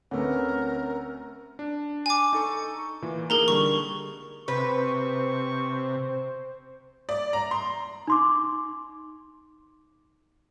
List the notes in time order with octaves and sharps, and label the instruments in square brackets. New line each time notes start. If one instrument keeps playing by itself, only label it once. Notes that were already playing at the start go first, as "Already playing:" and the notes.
[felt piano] D2 A3 [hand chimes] C4 C#5 F#5 [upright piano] C#4 B4 [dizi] A#4
[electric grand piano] D4
[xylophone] G#5 D6
[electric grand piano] D#4 A4 C#6
A#2 E3
[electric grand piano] A#3 D#4 [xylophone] G#4 A#4 A#5
[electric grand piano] D3 G3 [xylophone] C#6
[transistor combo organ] C3 [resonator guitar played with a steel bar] B4 [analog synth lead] C5 [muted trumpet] C#6
[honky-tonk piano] D5
A#5
C6
[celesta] D#4 C6 D6